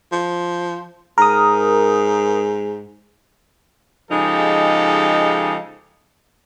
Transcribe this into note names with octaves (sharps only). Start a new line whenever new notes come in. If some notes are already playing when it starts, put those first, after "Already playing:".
F3
G#2 A#4 D#6
C#3 F3 G#3 D#4 G4 A4